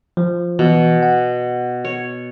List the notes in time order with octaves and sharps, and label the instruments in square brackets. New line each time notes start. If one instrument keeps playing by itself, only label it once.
[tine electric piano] F3
[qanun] B2 [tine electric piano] E3
[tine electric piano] F#5
[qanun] C#5